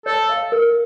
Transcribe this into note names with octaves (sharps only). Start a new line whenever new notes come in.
A4 C#5
F5
A#4